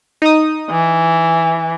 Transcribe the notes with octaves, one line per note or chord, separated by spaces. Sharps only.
D#4 D#6
E3